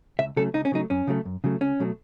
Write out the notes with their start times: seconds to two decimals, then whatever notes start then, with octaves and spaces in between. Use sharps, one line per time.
0.19 C#2 E5
0.37 C#3 F#3 A3 A4
0.54 C#2 D#4
0.65 C#4
0.72 C#3 F#3 A3 D#4
0.90 F#2 C#4
1.07 C#3 F#3 A3
1.25 F#2
1.44 C#3 F#3 A3
1.61 C#2 C#4
1.80 B2 F#3 A3